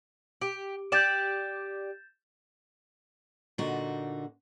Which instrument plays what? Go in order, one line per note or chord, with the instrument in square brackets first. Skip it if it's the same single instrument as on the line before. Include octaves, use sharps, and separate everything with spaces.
[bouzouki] G4
[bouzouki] G4 D5 [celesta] G6 A6 E7
[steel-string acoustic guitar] A#2 D3 D#4 F#4